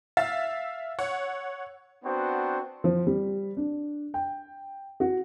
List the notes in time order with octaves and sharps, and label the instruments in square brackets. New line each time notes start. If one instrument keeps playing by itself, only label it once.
[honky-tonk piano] E5 F5 E6 A6
C#5 F#5
[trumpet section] B3 C4 D4 F#4 C5
[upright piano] F3
G3
D4
G5
F#4